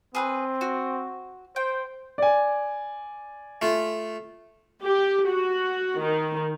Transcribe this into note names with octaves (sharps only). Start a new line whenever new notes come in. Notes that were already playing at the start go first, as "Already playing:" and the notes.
C4 G#4 A#4 B4
F#4
C5 G5
D5 G#5
A3 F4
G4
F#4
D#3